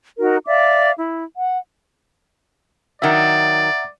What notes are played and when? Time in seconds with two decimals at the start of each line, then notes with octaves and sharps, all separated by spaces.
0.18 D#4 F#4 A#4
0.46 D5 E5 F5 D6
0.98 E4
1.36 F#5
3.02 D#3 F#3 D5 E5 F#5 A#5